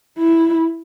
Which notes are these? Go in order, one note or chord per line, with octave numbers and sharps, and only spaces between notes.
E4